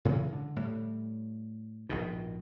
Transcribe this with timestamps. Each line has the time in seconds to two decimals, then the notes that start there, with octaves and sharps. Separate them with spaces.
0.05 A2 C#3 E3 G#3
0.33 D3
0.56 A2 G3
1.89 A#1 G#2 B2